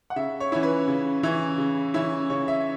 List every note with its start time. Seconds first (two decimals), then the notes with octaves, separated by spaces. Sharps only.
0.10 F#5
0.16 C#3 E5
0.40 C#5
0.52 E3 C#4 E4
0.63 B4
0.88 C#3
1.23 E3 C#4 E4
1.58 C#3
1.94 E3 C#4 E4
2.30 C#3 C#5
2.48 E5